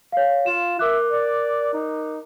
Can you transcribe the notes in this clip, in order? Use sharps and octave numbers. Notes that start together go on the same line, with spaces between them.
C#5 F5
F4 E7
A#4 E5 D6 F#6
D5
D#4